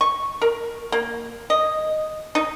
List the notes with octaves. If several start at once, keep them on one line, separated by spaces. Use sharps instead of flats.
C#6
A#4
A#3
D#5
D#4